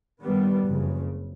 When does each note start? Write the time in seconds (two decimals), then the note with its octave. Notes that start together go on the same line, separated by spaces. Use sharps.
0.21 G2 D#3 G3 B3
0.65 F#1 F2 C#3